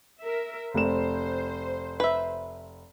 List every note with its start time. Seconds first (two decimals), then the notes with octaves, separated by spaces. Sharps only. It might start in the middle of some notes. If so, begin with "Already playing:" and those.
0.23 A#4 E5
0.74 F1 C5 E7
2.00 B4 E5